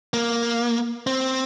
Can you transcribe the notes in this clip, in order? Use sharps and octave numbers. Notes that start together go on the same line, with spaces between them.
A#3
C4